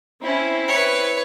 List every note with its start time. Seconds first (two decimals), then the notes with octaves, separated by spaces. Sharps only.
0.24 C4 C#4 E4
0.68 B4 C#5